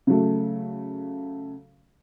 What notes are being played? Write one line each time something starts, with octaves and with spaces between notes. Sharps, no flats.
C#3 F#3 A3